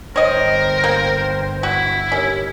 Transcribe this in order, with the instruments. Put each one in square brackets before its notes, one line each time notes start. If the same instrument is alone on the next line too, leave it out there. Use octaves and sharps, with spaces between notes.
[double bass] G1 [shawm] A#4 [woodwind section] C5 G5 [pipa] C#5 D#5
[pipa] A#3
[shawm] E4 [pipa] F#4
[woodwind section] D#2 [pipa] C#4